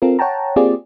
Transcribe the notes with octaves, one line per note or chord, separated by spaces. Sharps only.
C4 F4 A4 A#4
C#5 F#5 G5 A5 A#5
A#3 C4 F4 G4 G#4 D5